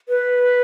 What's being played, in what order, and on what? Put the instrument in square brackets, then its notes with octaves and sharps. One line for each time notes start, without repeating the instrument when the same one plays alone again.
[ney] B4